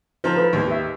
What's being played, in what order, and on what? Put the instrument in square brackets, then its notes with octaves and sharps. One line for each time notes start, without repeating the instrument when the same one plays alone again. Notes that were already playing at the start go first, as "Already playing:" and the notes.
[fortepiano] F3 C4 A#5 [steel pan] D#4 C5
[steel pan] A4 B4 B5
[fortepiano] D#2 [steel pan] G4 C#6
[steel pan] D#5 E5